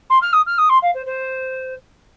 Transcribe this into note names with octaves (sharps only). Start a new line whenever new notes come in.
C6
F6
D#6
F6
D#6
C6
F5
C5
C5